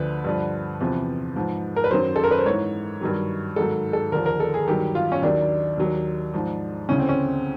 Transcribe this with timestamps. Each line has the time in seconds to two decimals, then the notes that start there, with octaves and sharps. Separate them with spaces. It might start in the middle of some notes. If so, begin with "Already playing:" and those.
Already playing: D2 D3 F3 B4
0.24 G2 D3 F3
0.81 E2 C3 F3
1.36 G#2 F3
1.76 A#4
1.84 B4
1.91 F#2 D#3 F#3 C5
2.16 A4
2.24 A#4
2.31 B4
2.39 C5
2.46 G#2 E3 C#5
3.01 G2 D#3 F#3
3.56 G#2 D#3 F#3 A4
3.93 A4
4.12 D#2 D3 F3 A#4
4.26 A#4
4.40 A4
4.54 G#4
4.68 G2 D#3 F#3 G4
4.95 F4
5.12 C#4
5.22 D#2 D#3 F#3 D4
5.78 D#2 D#3 F#3
6.34 G#2 F3
6.89 D2 C#3 E3 C#4
6.99 C4
7.09 C#4